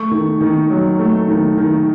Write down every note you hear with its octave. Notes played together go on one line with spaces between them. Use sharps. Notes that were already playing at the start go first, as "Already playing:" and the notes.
Already playing: A3 C#6
D#3
D#3
F#3
A3
D#3
D#3